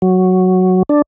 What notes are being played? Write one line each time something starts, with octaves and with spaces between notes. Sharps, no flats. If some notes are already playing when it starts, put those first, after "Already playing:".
F#3
D4